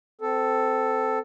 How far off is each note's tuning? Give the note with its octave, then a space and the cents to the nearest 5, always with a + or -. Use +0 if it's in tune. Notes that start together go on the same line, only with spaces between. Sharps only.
C4 -20 A4 +0